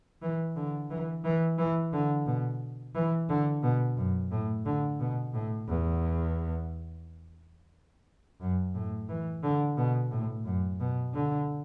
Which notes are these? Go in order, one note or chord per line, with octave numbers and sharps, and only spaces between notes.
E3
D3
E3
E3
E3
D3
B2
E3
D3
B2
F#2
A2
D3
B2
A2
E2
F#2
A2
E3
D3
B2
A2
F#2
B2
D3